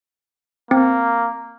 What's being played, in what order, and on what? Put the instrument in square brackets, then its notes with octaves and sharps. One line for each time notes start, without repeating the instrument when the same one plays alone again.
[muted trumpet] A#3 [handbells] C4